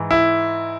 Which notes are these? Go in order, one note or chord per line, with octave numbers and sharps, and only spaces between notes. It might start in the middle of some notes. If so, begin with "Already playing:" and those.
Already playing: G#2 E3
E4